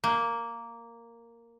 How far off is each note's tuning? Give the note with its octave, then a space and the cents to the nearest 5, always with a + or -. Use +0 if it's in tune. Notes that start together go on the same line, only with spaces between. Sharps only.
A#3 -5